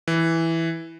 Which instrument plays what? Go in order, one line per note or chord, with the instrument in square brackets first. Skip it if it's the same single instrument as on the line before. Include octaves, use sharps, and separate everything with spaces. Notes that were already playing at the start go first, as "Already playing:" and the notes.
[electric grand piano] E3